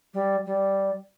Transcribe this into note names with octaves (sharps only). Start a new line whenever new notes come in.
G3
G3